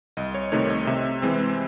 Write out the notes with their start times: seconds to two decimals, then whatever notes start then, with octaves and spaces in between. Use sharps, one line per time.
0.17 C2 D#5
0.34 C#5
0.52 C3 D#3 A3 D#4 C#5
0.70 D#5
0.87 C3 E5
1.22 E3 G#3 C4